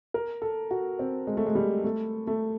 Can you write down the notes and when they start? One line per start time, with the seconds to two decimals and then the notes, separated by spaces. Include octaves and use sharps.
0.14 A#4
0.42 A4
0.71 F#4
0.99 C4
1.27 G#3
1.37 A3
1.46 G#3
1.55 G3
1.84 A3
2.27 A3